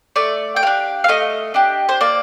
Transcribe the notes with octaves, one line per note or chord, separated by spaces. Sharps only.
A3 D5
G5
D4 G4 F5
F5
A3 D#5
D4 G4
C5
A#3 D5